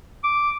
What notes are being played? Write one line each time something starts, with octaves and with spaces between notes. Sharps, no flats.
D6